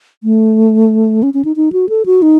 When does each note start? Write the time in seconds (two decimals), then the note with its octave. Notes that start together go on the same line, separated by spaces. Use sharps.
0.24 A3
1.23 C#4
1.34 C#4
1.45 D#4
1.56 D#4
1.73 F#4
1.89 A4
2.06 F#4
2.22 D#4